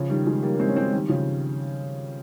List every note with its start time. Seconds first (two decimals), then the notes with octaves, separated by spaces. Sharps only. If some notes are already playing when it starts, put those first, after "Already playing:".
Already playing: C#3 F3
0.09 D#3 G3
0.26 F3 G#3
0.43 G3 A#3
0.54 A#3
0.60 G#3 C4
0.68 C#4
0.76 G#3 C4
0.93 D#3 G3
1.09 C#3 F3